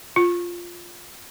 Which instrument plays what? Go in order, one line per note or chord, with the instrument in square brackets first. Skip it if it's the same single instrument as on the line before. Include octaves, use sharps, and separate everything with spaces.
[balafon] F4